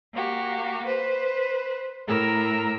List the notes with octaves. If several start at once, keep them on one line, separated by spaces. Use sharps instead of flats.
A#3 F#4 G4
B4 C5
A2 A#4 A#5 E6